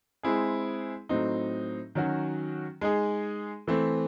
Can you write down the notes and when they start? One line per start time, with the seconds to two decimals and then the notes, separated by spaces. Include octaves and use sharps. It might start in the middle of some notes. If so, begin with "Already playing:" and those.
0.23 G#3 C4 E4 G#4
1.09 A2 F#3 C4 D#4
1.95 D#3 F#3 C#4 F#4
2.81 G#3 D#4 G#4
3.68 E3 A3 C4